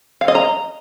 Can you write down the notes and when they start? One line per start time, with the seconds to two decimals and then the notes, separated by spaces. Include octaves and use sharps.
0.21 F5
0.28 D#5
0.35 A#5